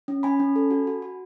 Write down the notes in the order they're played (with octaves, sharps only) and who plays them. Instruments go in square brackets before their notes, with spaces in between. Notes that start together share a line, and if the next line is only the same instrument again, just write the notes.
[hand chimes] C#4
C#4 G#5 B5
C#4
A4
F#4
F#4
F#4